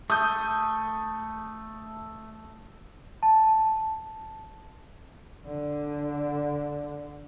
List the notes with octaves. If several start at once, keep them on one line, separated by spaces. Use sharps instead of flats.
A3 D#6 G6
A5
D3 D4